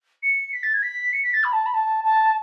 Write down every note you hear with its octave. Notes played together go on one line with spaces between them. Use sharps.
C#7
B6
A6
G#6
B6
C#7
B6
A6
B5
A5
B5
A5
A5